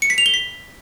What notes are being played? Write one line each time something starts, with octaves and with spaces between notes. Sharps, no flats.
C#7
B6
F7
G7
B6